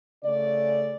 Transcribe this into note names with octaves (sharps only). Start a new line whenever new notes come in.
C#3 A3 D5